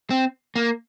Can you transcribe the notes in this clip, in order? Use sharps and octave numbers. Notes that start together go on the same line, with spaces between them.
C4
A#3